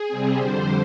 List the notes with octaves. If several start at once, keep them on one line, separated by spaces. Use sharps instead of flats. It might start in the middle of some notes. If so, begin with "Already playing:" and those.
Already playing: G#4
C3 G3 C4
F2 D3 G3 C5